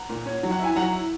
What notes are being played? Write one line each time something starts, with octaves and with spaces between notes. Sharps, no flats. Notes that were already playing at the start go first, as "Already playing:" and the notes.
Already playing: F#5 A#5
A#2
C#4
F#3
F#5
E4 G#5
F#3 F#5 A#5
E4